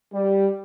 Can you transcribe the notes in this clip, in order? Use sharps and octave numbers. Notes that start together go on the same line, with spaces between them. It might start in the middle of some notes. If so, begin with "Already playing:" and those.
G3